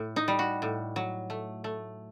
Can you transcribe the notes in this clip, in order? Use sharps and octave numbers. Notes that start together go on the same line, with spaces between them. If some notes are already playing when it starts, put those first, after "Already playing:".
Already playing: A2
D#4
G3
F#4
A2
F#3
A3
A3